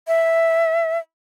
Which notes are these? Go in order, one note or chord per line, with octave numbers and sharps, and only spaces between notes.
E5